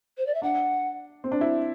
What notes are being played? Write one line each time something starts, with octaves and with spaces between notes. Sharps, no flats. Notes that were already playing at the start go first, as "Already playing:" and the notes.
C5
D5
E5
D4 F#5
C4
D4
E4